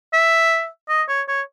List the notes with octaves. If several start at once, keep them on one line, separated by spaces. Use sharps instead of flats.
E5
D#5
C#5
C#5